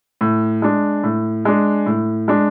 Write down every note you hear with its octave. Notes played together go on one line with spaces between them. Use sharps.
A2
G#3 D4
A2
G#3 D4
A2
G#3 D4